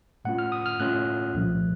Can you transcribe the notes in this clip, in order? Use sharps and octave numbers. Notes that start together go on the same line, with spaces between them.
A2 A3 C#4 F4 F#5
F6
D#6
F6
A2 A3 C#4 F4 F#6
C2 A#2 F3 A3